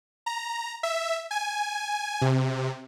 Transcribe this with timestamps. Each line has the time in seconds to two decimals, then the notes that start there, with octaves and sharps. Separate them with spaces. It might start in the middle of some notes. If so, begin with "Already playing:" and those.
0.26 A#5
0.83 E5
1.31 G#5
2.22 C3